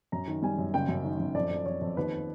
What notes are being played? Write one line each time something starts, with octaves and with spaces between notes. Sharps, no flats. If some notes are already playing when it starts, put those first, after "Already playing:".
F#2 A#5
D#3
G3 G#5
F#2
F#1 G5
F#2
D#3
F#2
F2 D5
F2
F2 C#5
F2
D#2 B4